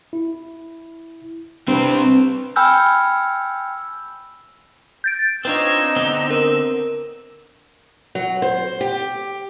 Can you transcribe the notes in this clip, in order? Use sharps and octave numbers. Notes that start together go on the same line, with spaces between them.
E4
G3 C4 D4 B4
G5 G#5 B5 E6 F6 G6
G6 A6 D7
C4 D4 D#4 F4 B4 C#5 E6
D3 B3 C4
A#4
F#3
C5
G4